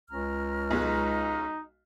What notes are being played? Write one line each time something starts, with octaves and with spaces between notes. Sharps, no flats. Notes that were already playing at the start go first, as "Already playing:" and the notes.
C#2 C#4 A#5 F6
B1 G#3 D#4